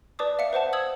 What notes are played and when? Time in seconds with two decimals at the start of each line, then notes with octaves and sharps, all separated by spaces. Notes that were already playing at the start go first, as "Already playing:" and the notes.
0.19 B4 D5 A5 D6 D#6
0.39 E5 F5 C#7
0.53 B4 C5 F#5 A5
0.73 D#6 E6 G#6 F#7